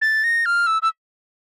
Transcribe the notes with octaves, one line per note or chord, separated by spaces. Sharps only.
A6
A#6
F6
E6
E6